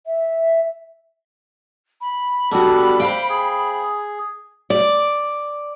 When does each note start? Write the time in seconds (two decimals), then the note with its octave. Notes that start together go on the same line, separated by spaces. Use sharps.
0.07 E5
2.01 B5
2.51 B2 G3 D4 F#4 A4
3.00 C5 F5 G5
3.30 G#4
4.70 D5